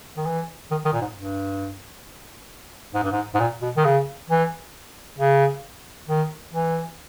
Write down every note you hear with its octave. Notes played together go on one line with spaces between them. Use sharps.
D#3
E3
D#3
D#3
A#2
G#2
G2
G#2
G2
G#2
G#2
A#2
B2
D#3
C#3
E3
C#3
D#3
E3